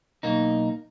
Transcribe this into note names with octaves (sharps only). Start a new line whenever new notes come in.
B1 A#3 D#4